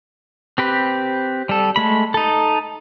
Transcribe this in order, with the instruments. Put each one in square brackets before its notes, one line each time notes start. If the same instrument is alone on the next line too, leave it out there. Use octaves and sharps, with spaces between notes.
[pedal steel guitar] C4 G4 B4
G3 A4
G#3 A3 B5
D#4 A4